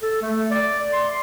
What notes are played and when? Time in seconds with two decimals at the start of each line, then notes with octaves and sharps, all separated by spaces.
0.02 A4
0.22 A3
0.51 D5
0.93 C6